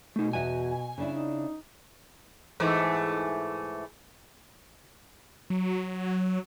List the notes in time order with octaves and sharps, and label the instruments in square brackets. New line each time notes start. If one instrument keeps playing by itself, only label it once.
[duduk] B2 [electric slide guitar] A3 D#4
[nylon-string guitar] E2 F#4 E5 [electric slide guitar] G#5
[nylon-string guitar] C#3 D4 E4
[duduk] D#4
[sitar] G#2 E3 A3
[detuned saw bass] F#3